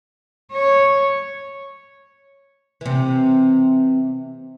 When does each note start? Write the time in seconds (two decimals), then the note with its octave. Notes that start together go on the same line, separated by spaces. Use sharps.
0.52 C#5
2.81 C3 E3